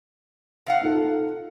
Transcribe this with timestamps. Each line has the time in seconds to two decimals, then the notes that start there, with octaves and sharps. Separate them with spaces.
0.66 C3 F5 F#5
0.81 D#4 F4 A4